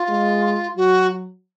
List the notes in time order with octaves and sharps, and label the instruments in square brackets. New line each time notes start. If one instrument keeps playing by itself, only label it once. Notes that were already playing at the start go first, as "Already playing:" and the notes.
Already playing: [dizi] F4
[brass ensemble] G#3
[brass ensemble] F#3 [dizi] F#4